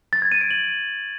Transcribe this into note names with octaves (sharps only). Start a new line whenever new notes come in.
A6
G#6
D#7
D7
F#7